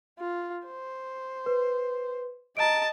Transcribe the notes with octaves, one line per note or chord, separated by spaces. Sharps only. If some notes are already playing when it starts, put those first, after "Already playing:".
F4
C5
B4
D#5 A5 A#5 D7